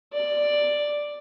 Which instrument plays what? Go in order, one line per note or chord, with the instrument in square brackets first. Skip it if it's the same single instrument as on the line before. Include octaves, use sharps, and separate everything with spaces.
[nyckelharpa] D5